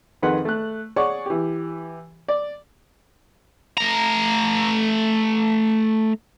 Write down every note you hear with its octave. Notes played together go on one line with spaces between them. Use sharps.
F2 D#3 G#4 B4 F#5 C6
A3 F#6
G#4 C#5 D5 F#5 C#6
E3 G4
D5
A3 A#5